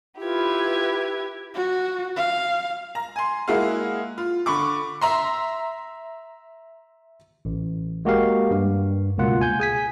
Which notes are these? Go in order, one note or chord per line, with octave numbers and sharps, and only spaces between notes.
E4 F4 G4 B4 G#6
F#4
F5
A#5
G#5 C6
G#3 A#3 E4 F#4 G#4 F5
F4
D3 B5 C#6 D6
E5 A#5 C6
A1
G#3 A#3 F#4 G4 A#4 F5
G2
C#2 B2 A#3 F4 F#5
G#5 G6
G#4 G#5 B6